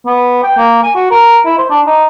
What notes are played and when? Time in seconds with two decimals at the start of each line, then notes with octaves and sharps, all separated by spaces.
0.06 B3
0.43 G5
0.57 A#3
0.84 G#5
0.95 F#4
1.11 A#4
1.46 E4
1.58 C5
1.70 D4
1.87 D#4